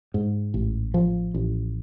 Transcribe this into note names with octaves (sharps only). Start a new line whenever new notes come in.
G#2
A1
F3
A1